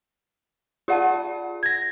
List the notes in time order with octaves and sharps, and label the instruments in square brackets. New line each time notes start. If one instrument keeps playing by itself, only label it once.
[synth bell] F4 G#4 D5 [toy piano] G4 F#5 A5
[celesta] G#6 A#6